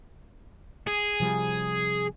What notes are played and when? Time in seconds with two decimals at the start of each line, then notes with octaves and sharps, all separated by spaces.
0.87 G#4
1.20 C3 F3 G3